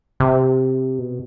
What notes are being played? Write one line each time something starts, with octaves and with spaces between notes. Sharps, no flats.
C3
B2